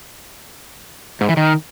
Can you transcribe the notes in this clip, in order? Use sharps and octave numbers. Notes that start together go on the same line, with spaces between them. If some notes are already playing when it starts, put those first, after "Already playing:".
G#2
E3
D#3